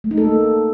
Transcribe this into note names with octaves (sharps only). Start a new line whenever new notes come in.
A3
D#4
A4
A#3